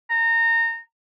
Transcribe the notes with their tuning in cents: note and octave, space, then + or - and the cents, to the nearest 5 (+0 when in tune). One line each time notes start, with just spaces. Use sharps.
A#5 -25